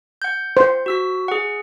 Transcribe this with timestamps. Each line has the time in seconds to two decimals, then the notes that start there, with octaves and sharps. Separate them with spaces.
0.22 F#5 G6
0.57 C5
0.86 F#4 E6 B6
1.28 G#4 F#5